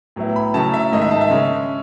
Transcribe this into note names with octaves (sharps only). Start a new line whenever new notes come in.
A2 F#3 B3 E4
B5
C#3 F#3 A3 C#4 E4 A5
E5
G#2 D#3 G#3 D#5
E5
A5
E5
C#3 G#3 C#4